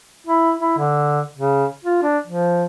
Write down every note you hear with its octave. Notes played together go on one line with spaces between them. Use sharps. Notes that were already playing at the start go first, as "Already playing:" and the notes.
E4
E4
D3
C#3
F4
D4
F3